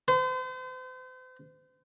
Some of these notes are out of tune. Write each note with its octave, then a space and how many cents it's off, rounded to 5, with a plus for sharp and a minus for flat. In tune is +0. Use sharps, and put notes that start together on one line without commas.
C5 -40